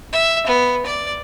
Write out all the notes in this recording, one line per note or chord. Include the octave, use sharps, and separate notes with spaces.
E5
B3
D5